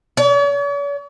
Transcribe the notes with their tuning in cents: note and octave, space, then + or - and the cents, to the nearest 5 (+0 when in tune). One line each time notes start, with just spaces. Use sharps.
C#5 +45